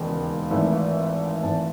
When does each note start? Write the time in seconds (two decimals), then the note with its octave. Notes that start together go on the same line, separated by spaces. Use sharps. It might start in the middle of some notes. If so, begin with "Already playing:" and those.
Already playing: E1 D#2 C#3 G#3
0.50 G#1 G#2 E3 A3
1.43 G#1 G#2 E3 A3 A5